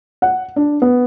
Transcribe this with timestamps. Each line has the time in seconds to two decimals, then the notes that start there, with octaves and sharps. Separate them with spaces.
0.22 F#5
0.56 D4
0.82 B3